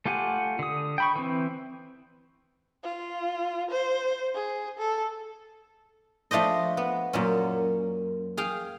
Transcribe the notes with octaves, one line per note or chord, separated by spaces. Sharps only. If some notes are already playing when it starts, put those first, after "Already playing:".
A3 F4 G4 F#5 G#5
D3 D#6
G5 B5 C#6
E3 C4
F4
C5
G#4
A4
F3 A3 D4 C5 D#5
B3
F#2 A#2 C#4
G#4 F5 G5